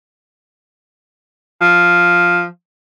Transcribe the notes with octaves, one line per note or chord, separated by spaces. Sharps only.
F3